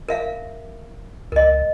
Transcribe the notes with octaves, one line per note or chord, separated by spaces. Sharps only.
A#4 E5 F5
C#2 A#4 D#5